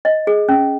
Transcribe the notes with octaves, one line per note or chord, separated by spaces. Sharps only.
D#5
G#4
C#4